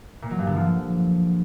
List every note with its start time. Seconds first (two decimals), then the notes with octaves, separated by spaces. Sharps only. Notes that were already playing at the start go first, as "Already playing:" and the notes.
0.22 A#2
0.31 F#3
0.39 G2
0.47 D3
0.56 F3